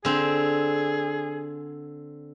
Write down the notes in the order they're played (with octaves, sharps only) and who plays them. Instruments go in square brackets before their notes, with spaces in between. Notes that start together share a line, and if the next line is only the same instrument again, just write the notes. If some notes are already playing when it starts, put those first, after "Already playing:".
[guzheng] D3 C4 [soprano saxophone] G#4